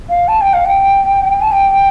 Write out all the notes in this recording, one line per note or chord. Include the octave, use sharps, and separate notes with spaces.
F5
A5
G5
F5
G5
A5
G5